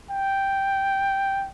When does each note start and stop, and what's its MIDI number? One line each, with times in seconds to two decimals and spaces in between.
0.11 1.49 79